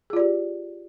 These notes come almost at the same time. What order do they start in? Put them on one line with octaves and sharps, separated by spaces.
G#4 F4 D5 G4